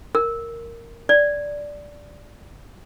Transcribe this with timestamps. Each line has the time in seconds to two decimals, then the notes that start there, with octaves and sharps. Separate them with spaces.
0.15 A#4
1.09 D5